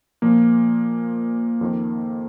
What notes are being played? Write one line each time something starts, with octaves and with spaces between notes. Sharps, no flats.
A#2 F3 A#3
F2 D#3